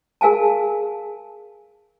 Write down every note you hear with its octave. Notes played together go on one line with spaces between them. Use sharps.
G#4 A#4 F5 G#5 A5